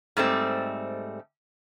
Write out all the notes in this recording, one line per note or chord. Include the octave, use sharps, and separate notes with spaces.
G#2 G3 A3 C4